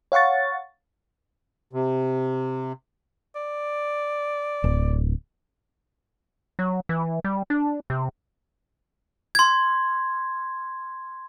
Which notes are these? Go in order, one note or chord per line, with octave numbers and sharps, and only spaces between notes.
C#5 F5 F#5 C#6 A6
C3
D5
D1
F#3
E3
G3
D4
C3
C6 G#6